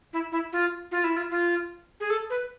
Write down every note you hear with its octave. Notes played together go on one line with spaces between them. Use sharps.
E4
E4
F4
F4
E4
F4
F4
G#4
A4
B4